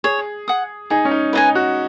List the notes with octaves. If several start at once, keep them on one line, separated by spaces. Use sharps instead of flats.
G#4 C#5
F#5 D#6
D#4 G#4
C#4
D#4
D#4 B4 D#5 G#5
F#4